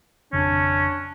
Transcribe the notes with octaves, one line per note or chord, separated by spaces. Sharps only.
G#1 F2 C#3 C#4 D4